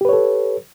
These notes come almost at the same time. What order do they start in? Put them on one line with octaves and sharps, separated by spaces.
G4 B4 C#5 A4